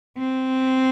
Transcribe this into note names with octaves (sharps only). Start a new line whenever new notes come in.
C4